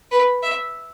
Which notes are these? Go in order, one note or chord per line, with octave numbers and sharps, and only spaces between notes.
B4
E5